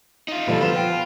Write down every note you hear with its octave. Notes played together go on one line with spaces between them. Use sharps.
D#4 F4
E1 D2 A#2 F3 G3 A4
F3 B3 F4 E7
G5